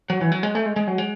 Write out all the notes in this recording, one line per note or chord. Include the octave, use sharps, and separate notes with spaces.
F#3
E3
F#3
G#3
A3
G#3
G#3
F#3
G#3